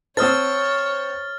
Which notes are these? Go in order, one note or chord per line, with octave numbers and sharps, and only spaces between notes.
C4 C5 C#5 A5 D#6 F6 A6